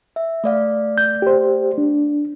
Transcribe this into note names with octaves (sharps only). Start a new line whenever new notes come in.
E5
A3 D5 F5
G6
G4 C5
D4